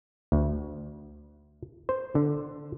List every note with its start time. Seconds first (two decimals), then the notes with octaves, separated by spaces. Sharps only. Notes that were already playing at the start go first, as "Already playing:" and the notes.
0.32 D2
1.89 C5
2.15 D3